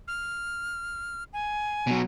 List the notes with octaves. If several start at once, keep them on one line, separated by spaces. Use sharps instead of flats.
F6
G#5
B2 F#3